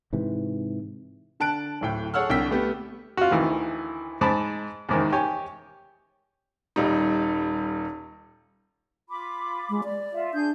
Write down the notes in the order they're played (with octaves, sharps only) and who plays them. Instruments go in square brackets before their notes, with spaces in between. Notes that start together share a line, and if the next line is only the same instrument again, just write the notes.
[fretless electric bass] G#2 C3 E3
[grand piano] D3 A5 F#6 D7
D1 A2 G5
G#4 A4 C#5 F#5 E6 F6
C2 D3 G5 E6 B6
A3 B3 G4
[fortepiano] F4 F#4
D2 D#3 E3
G#2 A5 B5
E2 G#2 D#3
G4 C#5 G#5
[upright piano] D#1 G3 D#4
[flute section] F4 B5 D6
[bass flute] G#3
D5
[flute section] F4 E5
[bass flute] D4 [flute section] G#4 G6